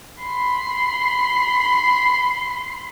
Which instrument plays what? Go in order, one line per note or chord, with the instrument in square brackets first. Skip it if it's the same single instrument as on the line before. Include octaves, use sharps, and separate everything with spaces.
[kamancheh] B5 C6